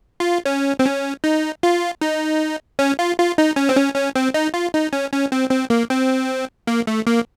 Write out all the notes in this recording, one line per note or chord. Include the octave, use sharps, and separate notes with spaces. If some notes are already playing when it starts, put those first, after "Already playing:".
F4
C#4
C4
C#4
D#4
F4
D#4
C#4
F4
F4
D#4
C#4
C4
C#4
C#4
C4
D#4
F4
D#4
C#4
C#4
C4
C4
A#3
C4
A#3
A3
A#3